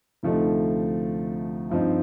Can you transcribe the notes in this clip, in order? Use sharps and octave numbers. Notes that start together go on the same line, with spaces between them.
D2 C3 F3 A3 D#4
G2 F3 C4 D#4